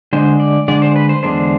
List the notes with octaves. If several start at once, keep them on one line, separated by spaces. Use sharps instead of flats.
D3 G#3 D4 C5
D5
D3 G#3 D4 D5
C5
B4
C5
E2 D3 G#3 B3 D4 C5